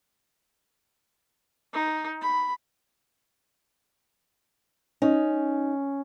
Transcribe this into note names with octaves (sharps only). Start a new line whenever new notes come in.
D#4
B5
C#4 D#4